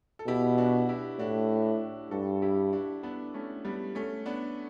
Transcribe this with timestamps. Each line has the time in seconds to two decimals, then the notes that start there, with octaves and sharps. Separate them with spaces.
0.19 A4
0.27 B2 E4 G4
0.58 D4 F#4
0.89 E4 G4
1.19 A2 D4 F#4
2.11 G2 F#4 A4
2.42 E4 G4
2.73 D4 F#4
3.03 B3 D4
3.34 A3 C#4
3.65 G3 B3
3.95 A3 C#4
4.26 B3 D4